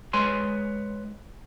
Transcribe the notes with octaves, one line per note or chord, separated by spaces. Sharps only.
G#3 B4 C#5 G#5 C6